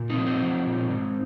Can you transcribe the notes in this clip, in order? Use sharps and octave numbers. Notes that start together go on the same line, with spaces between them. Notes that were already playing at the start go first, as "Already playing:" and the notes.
Already playing: A#2
C4 D#4
F3
C4 D#4
F3
A#2
G#2